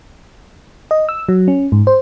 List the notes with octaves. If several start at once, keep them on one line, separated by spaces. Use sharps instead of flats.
D#5
E6
F#3
C#4
G#2
C5